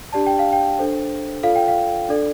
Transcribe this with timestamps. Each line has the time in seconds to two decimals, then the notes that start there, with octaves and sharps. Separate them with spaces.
0.12 D4 G4 D5 A5
0.26 G5
0.39 F5
0.53 G5
0.79 D4 A4 C5
1.43 F4 A4 D5 F5
1.56 G5
1.68 F5
2.09 D4 A4 D5